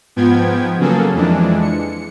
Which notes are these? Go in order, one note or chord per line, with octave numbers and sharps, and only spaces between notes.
G#2 F3 B3 G5 G#6
C#3 F#3 A#3 G#4 A4
F2 E3 G#3 D4
C#7